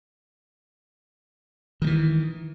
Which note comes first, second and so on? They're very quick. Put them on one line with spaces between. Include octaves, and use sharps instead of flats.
D#3 G#3 E3